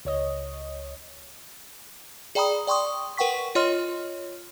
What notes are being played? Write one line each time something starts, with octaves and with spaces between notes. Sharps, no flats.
C#2 C#5 D#5
G#4 D5 G5 A#5 B5 D#6
D5 G5 C6 C#6 D#6
A#4 B4 F#5 G5 C#6 B6
F4 C#5 D#5 C6 F6